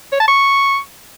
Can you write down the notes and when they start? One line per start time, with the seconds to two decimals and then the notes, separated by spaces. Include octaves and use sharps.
0.12 C#5
0.20 A5
0.28 C#6